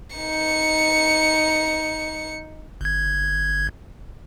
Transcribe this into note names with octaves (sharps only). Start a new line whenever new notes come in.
D#4 C#7
G1 G#6